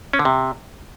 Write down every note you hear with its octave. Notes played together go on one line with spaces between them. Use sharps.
C#4
D3
C3